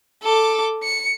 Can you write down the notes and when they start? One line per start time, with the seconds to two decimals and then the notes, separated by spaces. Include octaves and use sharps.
0.23 A4 D6
0.83 C#7